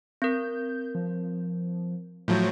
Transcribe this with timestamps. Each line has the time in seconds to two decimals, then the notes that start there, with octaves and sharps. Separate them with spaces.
0.22 C4 A#4 G6
0.95 F3
2.28 A2 F3 F#3 G6